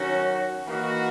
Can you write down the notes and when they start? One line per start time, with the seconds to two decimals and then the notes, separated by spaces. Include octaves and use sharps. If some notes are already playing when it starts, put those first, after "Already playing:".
Already playing: D#3 F#3 C#4 F#4
0.68 E3 A#3 D#4 F#4